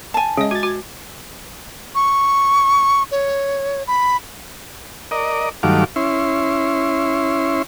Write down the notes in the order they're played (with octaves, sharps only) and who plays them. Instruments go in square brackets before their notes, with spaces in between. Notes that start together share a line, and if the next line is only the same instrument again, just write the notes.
[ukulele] G#5 A5
[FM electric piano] C#3 [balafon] G#3 D#5
[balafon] F#4 [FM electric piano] G#6 A6
[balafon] F#4
[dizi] C#6
C#5
B5
[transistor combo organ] A#4 D5 D#5
G2 D#3 F#3 A3 F5 D6
C#4 E4 C6